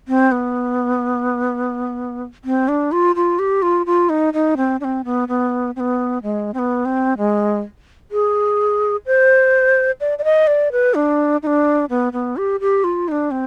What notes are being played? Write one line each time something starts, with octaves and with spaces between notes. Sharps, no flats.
C4
B3
C4
D4
F4
F4
G4
F4
F4
D#4
D#4
C4
D4
C4
B3
B3
C4
B3
G#3
C4
B3
C4
G#3
G#4
C5
D5
D5
D#5
D5
B4
D4
D#4
D4
B3
B3
G4
G4
F4
D#4
D4
C4